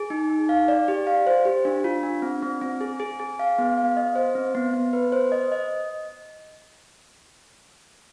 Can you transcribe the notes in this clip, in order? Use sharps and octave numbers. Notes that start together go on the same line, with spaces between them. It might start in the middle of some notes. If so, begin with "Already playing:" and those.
Already playing: G#4
D#4
D#4
F5
D5
G4
F5
C5
G4
D4
F4
D4
C4
C4
C4
G#4
G#4
G#4
F5
B3
F5
D#5
C5
C4
B3
B3
B4
C5
D#5
D#5